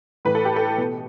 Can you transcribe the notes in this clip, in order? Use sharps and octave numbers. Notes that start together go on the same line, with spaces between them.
A2 E3 B4
A4
G4
A4
B2